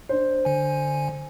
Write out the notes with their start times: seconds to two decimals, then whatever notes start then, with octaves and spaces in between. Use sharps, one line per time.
0.09 D4 C5
0.45 D3 G#5